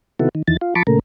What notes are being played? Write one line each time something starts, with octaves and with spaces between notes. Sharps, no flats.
C3 D#3 B3 E4 F#4 A4
D#3
E2 D#3 E3 A6
F4
F3 A5 B5 C#6 D6
A#2 C#3 A3 A#4